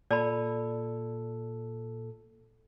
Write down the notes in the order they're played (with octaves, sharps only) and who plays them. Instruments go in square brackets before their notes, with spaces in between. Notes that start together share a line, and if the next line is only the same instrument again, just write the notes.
[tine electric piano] A#2 A4 [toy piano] D5 A5 B5